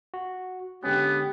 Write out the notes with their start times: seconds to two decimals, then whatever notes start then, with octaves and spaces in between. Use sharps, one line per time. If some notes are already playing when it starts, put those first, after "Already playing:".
0.14 F#4
0.84 D3 G#3 B3 C#4 G4